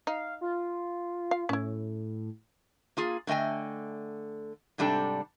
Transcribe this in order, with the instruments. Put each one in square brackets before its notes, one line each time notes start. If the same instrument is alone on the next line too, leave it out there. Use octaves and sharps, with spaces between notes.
[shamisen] D#4 [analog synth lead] F5
[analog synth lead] F4
[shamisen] F5
[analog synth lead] A2 [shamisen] C#4 E4
[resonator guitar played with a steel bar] A#3 F4 G#4
D3 A3 D#5 G5 G#5
G#2 C3 G3 D4 A4 G5